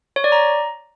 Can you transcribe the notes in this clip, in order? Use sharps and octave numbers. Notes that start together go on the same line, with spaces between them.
C#5
D5
A#5